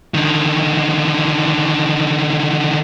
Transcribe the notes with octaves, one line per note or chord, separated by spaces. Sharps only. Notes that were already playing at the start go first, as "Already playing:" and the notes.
D3 D#3